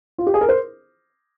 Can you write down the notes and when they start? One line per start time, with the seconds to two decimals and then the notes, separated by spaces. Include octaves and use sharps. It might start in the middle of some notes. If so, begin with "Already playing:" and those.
0.18 F4
0.27 G4
0.34 G#4
0.41 A#4
0.49 C5